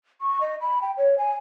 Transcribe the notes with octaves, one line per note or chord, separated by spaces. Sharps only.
C#6
D#5
B5
G5
C#5
G#5